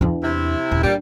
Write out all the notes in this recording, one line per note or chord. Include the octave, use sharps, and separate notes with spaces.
E2 D4
C3 E4
D#1
A#2 G3 D4